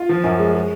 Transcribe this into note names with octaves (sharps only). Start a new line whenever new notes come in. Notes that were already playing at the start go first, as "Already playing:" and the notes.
Already playing: F4
F3
F#2
G#3
G#3